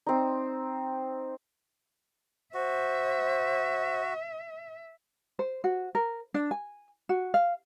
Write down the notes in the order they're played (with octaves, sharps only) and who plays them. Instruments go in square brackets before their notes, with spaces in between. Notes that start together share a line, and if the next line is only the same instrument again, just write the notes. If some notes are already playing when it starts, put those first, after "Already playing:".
[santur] C4 D#4
[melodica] F#4 [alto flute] C5 [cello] E5
[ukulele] C5
F#4
A#4
D4
G#5
F#4
F5